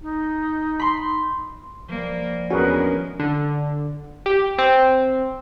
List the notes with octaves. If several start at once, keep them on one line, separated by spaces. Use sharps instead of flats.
D#4
B5 C6
F3 G3 A#3
E2 G#3 C#4 D4 F#4 G#4 A#4 B4
D3
G4
C4